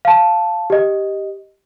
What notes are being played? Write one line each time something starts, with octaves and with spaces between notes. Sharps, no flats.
F5 A5
G4 D#5